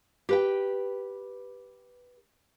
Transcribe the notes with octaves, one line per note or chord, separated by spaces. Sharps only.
G4 B4 G5